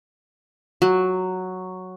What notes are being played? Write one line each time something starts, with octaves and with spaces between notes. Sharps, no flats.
F#3